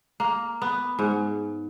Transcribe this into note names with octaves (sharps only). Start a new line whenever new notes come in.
A#3
B3
G#2